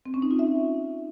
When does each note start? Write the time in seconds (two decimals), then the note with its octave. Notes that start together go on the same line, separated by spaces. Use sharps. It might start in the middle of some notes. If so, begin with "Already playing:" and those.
0.06 C4
0.14 C#4
0.22 D#4
0.31 F4
0.39 E5